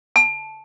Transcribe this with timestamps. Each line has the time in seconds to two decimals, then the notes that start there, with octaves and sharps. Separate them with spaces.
0.16 A5